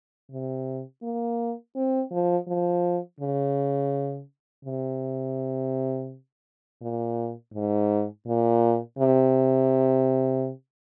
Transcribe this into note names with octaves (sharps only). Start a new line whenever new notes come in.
C3
A#3
C4
F3
F3
C#3
C3
A#2
G#2
A#2
C3